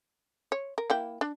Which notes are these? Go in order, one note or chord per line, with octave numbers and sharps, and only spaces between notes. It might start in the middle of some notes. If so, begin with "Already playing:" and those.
C#5
A#4
A#3 E4 G5
D4